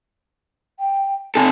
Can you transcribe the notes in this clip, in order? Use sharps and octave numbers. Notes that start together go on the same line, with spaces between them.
G5
C3 A4 G#5